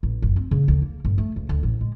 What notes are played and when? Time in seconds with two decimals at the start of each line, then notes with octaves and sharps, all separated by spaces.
0.03 A1
0.22 F#1
0.36 C4
0.51 C#3
0.68 D2
0.82 A#3
1.05 G1
1.18 A3
1.36 C#2
1.49 D2
1.63 A1
1.81 G#3